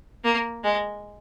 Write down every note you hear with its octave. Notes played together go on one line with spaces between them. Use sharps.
A#3
G#3